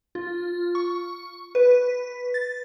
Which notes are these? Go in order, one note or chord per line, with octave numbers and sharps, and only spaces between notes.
F4
C#6
B4
A6